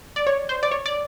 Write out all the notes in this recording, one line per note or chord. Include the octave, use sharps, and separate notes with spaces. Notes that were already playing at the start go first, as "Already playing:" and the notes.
D5
C#5
C5
D5
C#5
D5